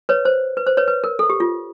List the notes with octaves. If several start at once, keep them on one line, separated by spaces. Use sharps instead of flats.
B4 C#5
C5
B4
C5
B4 C#5
B4
A#4
A4
G4
F4